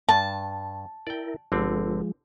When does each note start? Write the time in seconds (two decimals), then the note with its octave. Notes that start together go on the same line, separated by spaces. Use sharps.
0.09 G2 A5
1.07 E4 A#4 D5 G5
1.52 G1 D3 F3 G#3 C4